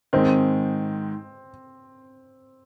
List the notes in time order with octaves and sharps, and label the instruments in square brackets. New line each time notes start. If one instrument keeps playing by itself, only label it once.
[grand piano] G#2 D#3 G#3 [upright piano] C4